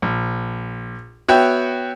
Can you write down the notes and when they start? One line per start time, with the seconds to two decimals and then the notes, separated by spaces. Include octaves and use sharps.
0.02 A#1
1.28 B3 F#4 C#5 E5 G5